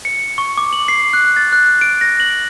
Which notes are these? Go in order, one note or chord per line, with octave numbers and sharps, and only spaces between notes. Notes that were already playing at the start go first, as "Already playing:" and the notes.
C#7
C#6
D6
F#7
C7
F#6
A6
F#6
D7
A#6
F#7